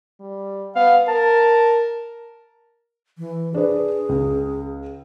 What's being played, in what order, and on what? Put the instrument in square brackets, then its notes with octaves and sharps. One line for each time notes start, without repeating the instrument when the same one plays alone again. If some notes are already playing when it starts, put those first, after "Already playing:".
[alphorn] G3
[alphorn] B3 [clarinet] F5
[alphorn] A#4 [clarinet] A5
[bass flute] E3
[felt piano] D4 B4 [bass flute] G#4
[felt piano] C#2